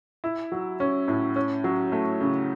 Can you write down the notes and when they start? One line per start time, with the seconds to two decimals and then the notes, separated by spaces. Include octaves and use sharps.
0.24 E4
0.52 F#3
0.80 C#4
1.08 A2
1.36 C#4
1.64 F#3
1.92 A3
2.21 C#3